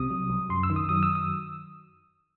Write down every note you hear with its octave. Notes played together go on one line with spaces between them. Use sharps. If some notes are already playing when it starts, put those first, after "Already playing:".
Already playing: C2 C3 D#6
F#3
C2
F#2 C6
E6
D#3
D#6
F#3 D#6
E6
D#6